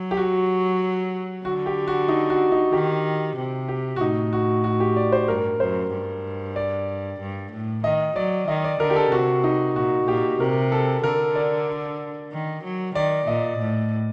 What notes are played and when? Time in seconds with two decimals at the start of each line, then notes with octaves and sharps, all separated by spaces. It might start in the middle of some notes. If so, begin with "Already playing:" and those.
Already playing: F#3
0.11 G4
0.17 F#4
1.45 D3 F#4
1.66 G4
1.87 F#4
2.08 D#4
2.30 F#4
2.52 D#4
2.73 D#3 G4
3.37 C3
3.69 G4
3.96 F#4
4.00 A2 D#4
4.33 F#4
4.64 F#4
4.80 G4
4.97 D5
5.12 C5
5.28 G2 A#4
5.60 F#2 C5
5.92 G2
6.56 D5
7.20 G2
7.52 A2
7.84 D#3 D#5
8.16 F#3 D5
8.48 D#3 D#5
8.64 D5
8.80 D3 A#4
8.90 G4
8.96 A4
9.12 C3 F#4
9.44 D#4
9.76 A#2 F#4
10.07 A#2 G4
10.40 C3 A#4
10.72 A4
11.04 D3 A#4
11.35 D5
12.32 D#3
12.64 F#3
12.95 D#3 D5
13.27 A#2 D#5
13.59 A2